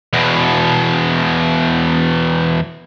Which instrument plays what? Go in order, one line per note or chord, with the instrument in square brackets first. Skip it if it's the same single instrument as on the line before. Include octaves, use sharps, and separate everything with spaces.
[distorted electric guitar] E2 B2